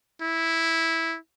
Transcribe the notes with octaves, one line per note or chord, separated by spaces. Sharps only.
E4